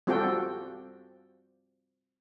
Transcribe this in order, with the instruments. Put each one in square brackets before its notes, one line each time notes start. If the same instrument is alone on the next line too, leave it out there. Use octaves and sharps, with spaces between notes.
[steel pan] G3 C4 F4 F#4 A4 G5